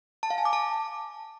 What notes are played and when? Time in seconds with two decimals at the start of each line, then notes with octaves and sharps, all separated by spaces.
0.23 A5
0.30 F5
0.38 G#5
0.45 D6
0.53 A5